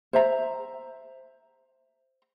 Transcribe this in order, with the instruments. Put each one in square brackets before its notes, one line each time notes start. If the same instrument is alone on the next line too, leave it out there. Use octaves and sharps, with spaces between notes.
[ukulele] C5 E5 A#5